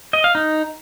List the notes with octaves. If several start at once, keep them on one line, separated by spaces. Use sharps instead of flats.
D#5
F5
D#4